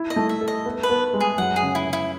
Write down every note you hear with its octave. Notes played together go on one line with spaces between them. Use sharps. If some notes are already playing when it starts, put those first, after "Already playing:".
Already playing: E4
D#5
A3
E5
A4
D#5
B3
B4
B3
G#3
G#4
F#2 F#5
G#4
C#3
E4
C#3
E4